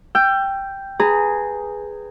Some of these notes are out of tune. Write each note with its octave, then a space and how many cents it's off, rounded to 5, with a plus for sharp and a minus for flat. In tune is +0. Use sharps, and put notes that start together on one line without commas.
G5 +0 E6 +35
G#4 +0 B4 +0 A#5 -25